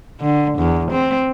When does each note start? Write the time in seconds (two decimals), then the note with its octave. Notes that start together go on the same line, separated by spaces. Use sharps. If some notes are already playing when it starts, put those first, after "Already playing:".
0.21 D3
0.58 E2
0.91 C4